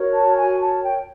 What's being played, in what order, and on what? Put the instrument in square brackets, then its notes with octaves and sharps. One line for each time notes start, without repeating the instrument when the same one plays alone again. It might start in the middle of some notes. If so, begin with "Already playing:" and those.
Already playing: [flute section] F#4 A#4 C#5
A5
G#5
A5
G5